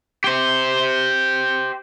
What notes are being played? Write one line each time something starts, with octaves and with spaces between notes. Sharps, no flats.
G4 C5